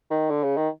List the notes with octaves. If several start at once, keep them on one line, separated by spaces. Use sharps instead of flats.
D#3
D3
C#3
D#3